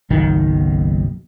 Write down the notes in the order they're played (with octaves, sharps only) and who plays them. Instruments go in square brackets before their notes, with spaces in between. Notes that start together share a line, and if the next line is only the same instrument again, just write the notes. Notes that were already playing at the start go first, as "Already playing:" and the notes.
[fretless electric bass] F#1 B1 D#3